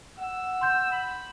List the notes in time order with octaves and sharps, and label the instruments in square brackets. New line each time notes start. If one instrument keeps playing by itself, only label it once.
[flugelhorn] F#5 [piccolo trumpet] E6
[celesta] C6 G6
[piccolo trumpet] B5